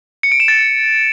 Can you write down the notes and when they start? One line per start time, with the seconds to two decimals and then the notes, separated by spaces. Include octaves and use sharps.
0.23 C#7
0.32 D7
0.40 E7
0.48 A6